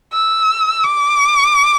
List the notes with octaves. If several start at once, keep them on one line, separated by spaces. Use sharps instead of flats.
E6
D6